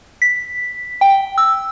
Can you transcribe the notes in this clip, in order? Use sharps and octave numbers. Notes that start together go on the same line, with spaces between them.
B6
G5
E6